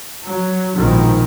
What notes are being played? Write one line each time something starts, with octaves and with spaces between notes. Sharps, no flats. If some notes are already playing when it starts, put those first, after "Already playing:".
F#3
A#1 G#2 B2 D#3